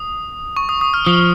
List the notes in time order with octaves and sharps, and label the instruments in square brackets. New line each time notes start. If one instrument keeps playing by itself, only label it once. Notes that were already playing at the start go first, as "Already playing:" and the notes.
Already playing: [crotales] D#6
C#6
D#6
D#6
F6
[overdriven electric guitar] F3 [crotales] D#6